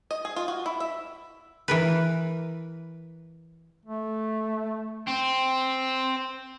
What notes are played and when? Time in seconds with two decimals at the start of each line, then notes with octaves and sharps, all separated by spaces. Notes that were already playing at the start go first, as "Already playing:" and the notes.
0.11 D#5
0.25 G#4
0.36 F4
0.48 F#4
0.66 E4
0.80 E5
1.68 E3 A#4 B4
3.85 A3
5.07 C4